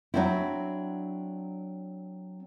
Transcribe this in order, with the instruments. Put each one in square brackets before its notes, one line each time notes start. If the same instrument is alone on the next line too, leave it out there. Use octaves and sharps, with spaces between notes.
[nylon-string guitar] F#3 A#3 C4 D4 E4